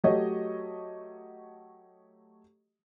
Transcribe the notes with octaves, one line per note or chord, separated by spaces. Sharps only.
F#3 A3 G4 C#5 D#5